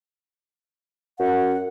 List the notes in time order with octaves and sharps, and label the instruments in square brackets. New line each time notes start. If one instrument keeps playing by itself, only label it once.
[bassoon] F#2 [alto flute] F#5